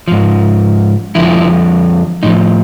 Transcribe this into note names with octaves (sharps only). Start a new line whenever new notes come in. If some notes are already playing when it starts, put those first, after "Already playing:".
G#2 F3
F2 D3 F3 E4
A2 F3 D#4